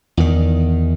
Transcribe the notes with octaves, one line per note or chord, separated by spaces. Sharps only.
E2 D#3